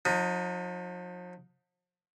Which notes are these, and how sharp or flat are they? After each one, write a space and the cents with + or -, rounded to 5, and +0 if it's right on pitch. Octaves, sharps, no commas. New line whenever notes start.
F3 +45 D#4 +0